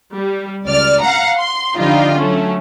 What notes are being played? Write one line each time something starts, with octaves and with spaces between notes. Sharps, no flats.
G3
C#2 D5 F6
F5 F#5 A#5
C6
D3 F3 G3 D#4 F4
F#3 A3 C#4